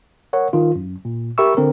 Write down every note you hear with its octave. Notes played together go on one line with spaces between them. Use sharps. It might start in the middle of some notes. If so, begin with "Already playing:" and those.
A#4 C#5 F#5
G#1 D#3 F4
F#2
A#2
G4 A#4 E5 B5 C#6 E6
D3 C4 A#4